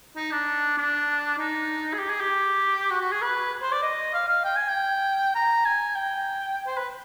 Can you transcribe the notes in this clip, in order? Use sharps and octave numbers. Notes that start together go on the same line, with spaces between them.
D#4
D4
D4
D#4
G#4
G4
G#4
G4
F#4
F#4
G#4
B4
C5
D5
D#5
F5
F5
G5
G#5
G5
A#5
G#5
G5
C5
B4